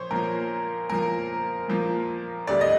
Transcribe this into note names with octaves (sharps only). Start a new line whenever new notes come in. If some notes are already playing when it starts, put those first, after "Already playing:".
Already playing: A#2 F3 C5 C#5
A#2 F3 A#3 A#4
A#2 F3 A#3 A#4
A#2 F3 A#3
D2 D3 G3 A#3 D5
D#5